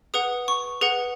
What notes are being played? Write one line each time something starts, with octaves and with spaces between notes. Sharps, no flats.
G#4 B4 F#5 D#6
C#6
G#4 B4 F#5